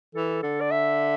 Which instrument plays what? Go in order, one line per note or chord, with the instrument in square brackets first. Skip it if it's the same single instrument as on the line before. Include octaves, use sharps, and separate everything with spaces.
[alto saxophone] E3 [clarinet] A4
[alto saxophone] D3 [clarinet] A4
[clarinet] D5
E5